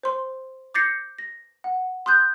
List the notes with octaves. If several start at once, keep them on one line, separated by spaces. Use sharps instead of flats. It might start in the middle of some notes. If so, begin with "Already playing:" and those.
C5 C6
D6 G6 A6 A#6 C7 C#7
A#6
F#5
C6 D#6 F#6 G6